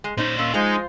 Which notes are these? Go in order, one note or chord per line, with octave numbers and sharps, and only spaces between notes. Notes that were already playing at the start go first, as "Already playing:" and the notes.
G#3
A#2 C#4 D#4 C5 D#5
A#3 C#4 C6 E6
F3 G#3 D#4 F4 C5